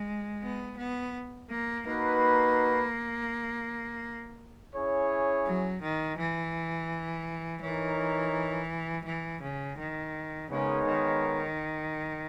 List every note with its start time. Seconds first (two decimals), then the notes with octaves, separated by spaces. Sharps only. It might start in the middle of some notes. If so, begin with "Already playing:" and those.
Already playing: G#3
0.43 B3
0.78 B3
1.50 A#3
1.87 A#3 D#4 F#4 B4
4.74 C#4 E4 G#4 C#5
5.46 F#3
5.83 D#3
6.19 E3
7.62 E3 D#4 A#4 C#5
9.05 E3
9.42 C#3
9.79 D#3
10.50 C#3 G#3 B3 D#4 A#4 C#5
10.86 D#3